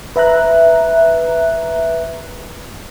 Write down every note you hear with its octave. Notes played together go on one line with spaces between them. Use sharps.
B4 E5 A#5 F#6